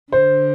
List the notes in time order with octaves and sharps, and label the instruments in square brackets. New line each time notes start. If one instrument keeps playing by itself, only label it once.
[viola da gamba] D3 [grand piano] C5